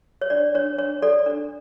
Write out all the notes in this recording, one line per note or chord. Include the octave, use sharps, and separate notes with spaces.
C#5
D4 D5
D4 C#5
D4 C#5
A4 D5
D4